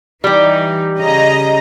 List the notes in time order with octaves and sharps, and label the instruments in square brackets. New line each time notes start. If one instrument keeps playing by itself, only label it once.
[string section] E3 D#4 [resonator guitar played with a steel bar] G3 G4
[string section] C#3 D#5 A#5